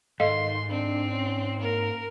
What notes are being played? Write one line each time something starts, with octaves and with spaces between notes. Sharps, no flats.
G#2 D#3 A4 D#5 F5 C6
C4 D4
C#4
A#3 A#4